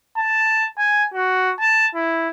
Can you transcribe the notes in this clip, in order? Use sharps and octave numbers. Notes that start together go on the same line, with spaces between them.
A5
G#5
F#4
A5
E4